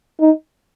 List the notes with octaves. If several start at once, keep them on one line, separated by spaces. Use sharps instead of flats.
D#4